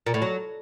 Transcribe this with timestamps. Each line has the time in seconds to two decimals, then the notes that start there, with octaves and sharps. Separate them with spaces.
0.06 A#2
0.14 A2
0.22 F#3